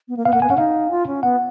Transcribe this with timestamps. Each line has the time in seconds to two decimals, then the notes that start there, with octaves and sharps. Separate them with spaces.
0.08 B3
0.17 A#3
0.25 B3 F5
0.33 A#3 F#5
0.42 B3 G#5
0.49 C#4 F#5
0.58 D#4 F5
0.91 F4
1.07 C#4
1.23 B3 F#5